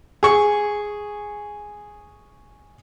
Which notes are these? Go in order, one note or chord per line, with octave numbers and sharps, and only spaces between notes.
G#4 C#6